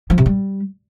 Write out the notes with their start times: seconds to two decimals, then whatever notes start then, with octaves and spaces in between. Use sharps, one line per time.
0.10 F3
0.18 C3
0.26 G3